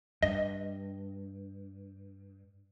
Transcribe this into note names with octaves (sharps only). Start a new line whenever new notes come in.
G2 D#5